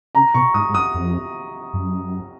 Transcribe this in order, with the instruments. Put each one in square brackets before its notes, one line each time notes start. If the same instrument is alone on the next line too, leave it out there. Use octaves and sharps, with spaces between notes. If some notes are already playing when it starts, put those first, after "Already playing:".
[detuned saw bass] C#3 [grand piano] A#5
[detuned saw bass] B2 [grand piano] C#6
[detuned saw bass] G#2 [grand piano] D#6
[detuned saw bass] G#2
[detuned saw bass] F#2 [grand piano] D#6
[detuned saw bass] F2
F#2